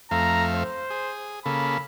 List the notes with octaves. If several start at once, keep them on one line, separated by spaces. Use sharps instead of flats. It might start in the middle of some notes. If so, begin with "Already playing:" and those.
F2 A3 F5 A#5
C5
G#4
C#3 A#3 A4 B5